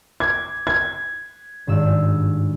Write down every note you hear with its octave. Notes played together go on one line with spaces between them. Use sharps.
D6 G#6
G#6
G#1 G2 E6